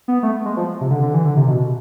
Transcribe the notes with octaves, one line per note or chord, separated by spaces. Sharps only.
B3
A3
G#3
F3
C3
D3
D3
E3
D3
C3
B2